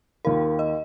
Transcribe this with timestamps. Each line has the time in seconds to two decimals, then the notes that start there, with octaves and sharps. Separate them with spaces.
0.25 D#2 D#3 A#3 F4 A#4
0.59 D#5